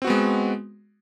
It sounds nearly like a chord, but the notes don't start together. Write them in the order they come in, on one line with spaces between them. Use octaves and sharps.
C4 F#4 B3 G#3